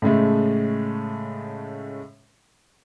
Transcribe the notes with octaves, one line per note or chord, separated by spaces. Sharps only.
A2 C#3 G#3 A3